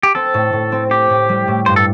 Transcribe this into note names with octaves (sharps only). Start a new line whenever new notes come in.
G4
C4 A4
A2
A2
C4
C4 G4
A2
G3
A2
G2 C5
A4